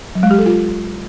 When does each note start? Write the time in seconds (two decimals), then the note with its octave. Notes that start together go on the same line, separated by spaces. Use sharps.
0.15 F#3
0.23 G#3
0.31 G4
0.38 A4
0.46 F4